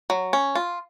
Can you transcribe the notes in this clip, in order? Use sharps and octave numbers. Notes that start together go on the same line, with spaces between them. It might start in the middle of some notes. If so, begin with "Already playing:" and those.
F#3
C#4
F4